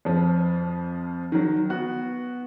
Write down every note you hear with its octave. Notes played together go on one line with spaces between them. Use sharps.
F2 F3
D#3 F#3
B3 F#4